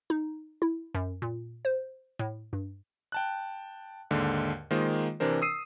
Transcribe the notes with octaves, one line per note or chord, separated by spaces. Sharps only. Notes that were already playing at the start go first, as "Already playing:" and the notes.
D#4
E4
F#2
A#2
C5
A2
G2
G5 A5 F#6
D#2 G#2 D3
D#3 G#3 A#3 F4 C5 D#5
C3 E3 D4 A#4 C5
D#6 E6 C7 D#7